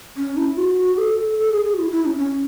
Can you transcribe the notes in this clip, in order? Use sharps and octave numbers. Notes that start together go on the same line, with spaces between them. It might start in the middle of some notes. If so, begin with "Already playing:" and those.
C#4
E4
F#4
A4
A4
G#4
G#4
F#4
E4
E4
C#4
C#4